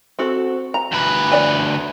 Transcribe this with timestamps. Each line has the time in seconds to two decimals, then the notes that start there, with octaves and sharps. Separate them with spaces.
0.19 C4 F#4 A4
0.74 A#5
0.92 D2 B4
1.32 B3 D5 G#5